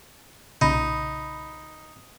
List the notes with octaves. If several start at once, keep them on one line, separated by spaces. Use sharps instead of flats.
B1 A#2 C#3 D#4 B5